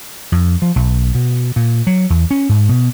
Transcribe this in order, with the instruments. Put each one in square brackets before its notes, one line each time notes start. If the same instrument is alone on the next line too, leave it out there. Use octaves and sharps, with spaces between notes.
[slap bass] F2
F3
B1
B2
A#2
F#3
E2
C#4
G#2
B2